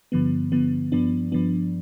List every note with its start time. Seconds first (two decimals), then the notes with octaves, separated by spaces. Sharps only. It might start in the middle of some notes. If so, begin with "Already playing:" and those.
0.12 G2 D3 F3 B3
0.52 G2 D3 F3 B3
0.92 G2 F3 B3 D4
1.32 G2 F3 B3 D4